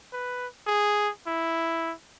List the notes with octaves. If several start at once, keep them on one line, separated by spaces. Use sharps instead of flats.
B4
G#4
E4